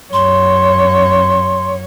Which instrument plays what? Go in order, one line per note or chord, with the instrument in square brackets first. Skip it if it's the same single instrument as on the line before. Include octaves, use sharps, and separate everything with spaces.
[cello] F#2 C#5 [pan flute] C6